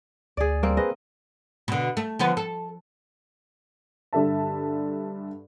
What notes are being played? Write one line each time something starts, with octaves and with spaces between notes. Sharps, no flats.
D2 G#4 D5
G3 A#3 C4
G#4 B4 C5 D#5
B2 D3
A3
D3 F3 B3
A4
G2 D3 A4 E5 A5